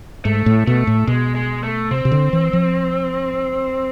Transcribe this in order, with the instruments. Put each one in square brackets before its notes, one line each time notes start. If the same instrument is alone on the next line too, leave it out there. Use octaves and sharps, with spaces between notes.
[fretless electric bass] G#2 [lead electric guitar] A3
[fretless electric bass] A2
[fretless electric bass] B2 [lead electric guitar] A3
[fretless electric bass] A2
[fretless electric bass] B2 [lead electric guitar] G#3
[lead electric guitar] G#3
A3
[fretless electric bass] C3 [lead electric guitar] C4
[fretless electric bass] C3
D3
E3
F3